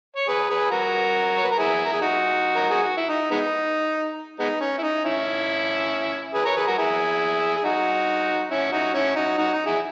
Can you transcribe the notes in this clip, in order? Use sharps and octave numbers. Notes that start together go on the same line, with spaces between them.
C#5
G#4 B4
G#4 B4
F#4 A#4
C#5
B4
A#4
E4 G#4
A#4
G#4
D#4 F#4
A#4
G#4
F#4
E4
D#4
G#3 B3 D#4
G#3 B3 D#4
C#4
E4
D#4
C#4 E4
G#4 B4
A#4 C#5
G#4 B4
F#4 A#4
E4 G#4
G#4
D#4 F#4
C#4 E4
D#4 F#4
C#4 E4
D#4 F#4
D#4 F#4
D#4
E4 G#4